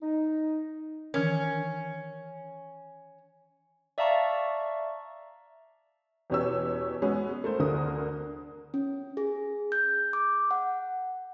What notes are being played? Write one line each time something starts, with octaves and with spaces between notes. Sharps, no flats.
D#4
D#3 E3 C#4 A#4
D5 E5 F5 A5 A#5 C#6
E2 B2 C#4 G4 C#5 E6
G#3 B3 C#4 F#4 G#4
A3 A#4 C5
D2 D3 A#4 D#6
C#4
G#4
G6
D6
F#5